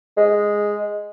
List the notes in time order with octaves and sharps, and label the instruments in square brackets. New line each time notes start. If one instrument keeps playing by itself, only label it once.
[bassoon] G#3